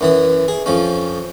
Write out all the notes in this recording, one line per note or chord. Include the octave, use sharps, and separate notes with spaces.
F#2 E3 D#6
G#4
F2 F3 C#4